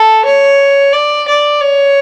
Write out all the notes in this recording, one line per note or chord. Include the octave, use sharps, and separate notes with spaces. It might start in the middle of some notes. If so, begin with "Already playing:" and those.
Already playing: A4
C#5
D5
D5
C#5